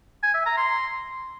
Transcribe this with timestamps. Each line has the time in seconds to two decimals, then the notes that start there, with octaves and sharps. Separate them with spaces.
0.23 G#5
0.35 E5
0.46 A#5
0.57 C6